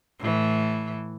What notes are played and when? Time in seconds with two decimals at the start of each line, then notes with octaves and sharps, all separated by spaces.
0.20 A2 E3